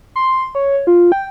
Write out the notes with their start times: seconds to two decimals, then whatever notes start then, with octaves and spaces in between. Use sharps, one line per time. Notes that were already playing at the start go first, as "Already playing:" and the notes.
0.16 C6
0.55 C#5
0.87 F4
1.12 G5